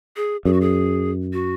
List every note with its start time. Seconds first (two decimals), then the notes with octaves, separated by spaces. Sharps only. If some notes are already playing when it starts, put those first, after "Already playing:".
0.16 G#4
0.45 F#2 G#4
0.53 F#4
0.61 G#4
1.33 F#4